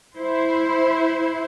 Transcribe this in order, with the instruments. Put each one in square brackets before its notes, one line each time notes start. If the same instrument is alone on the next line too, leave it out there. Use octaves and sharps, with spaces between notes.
[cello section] E4 C5